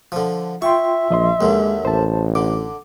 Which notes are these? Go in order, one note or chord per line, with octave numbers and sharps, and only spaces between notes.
D3 F3
F4 E5 G5 C6 C#6
A#1 F3 D#5 C6
D#2 D3 G#3
A1 C5 A5
D3 D6